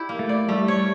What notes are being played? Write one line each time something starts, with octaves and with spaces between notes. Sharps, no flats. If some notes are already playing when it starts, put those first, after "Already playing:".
Already playing: E4 G4
A#3
A3
D5
G3 A3
C#5